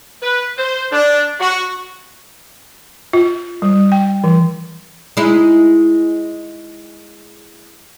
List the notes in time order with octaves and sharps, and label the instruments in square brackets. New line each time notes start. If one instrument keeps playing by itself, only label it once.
[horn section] B4
C5
D4
F#4
[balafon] F4
G3
G5
E3
[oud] G#3 D#4 E4